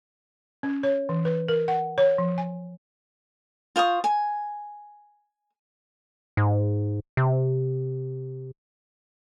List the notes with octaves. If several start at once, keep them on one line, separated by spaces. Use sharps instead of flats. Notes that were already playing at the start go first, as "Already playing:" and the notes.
C#4
C#5
E3
B4
A#4
F#5
C#5
F3
G#5
F4 C5 C#6 D#6
G#5
G#2
C3